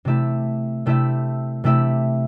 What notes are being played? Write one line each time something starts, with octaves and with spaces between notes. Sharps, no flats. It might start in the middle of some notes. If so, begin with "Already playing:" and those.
C3 A3 E4 G4 E5
C3 A3 E4 G4 E5
C3 A3 E4 G4 E5